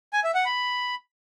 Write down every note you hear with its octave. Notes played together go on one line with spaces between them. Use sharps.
G#5
E5
F#5
B5